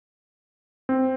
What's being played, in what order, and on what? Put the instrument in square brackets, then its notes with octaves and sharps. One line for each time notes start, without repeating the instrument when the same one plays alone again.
[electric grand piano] C4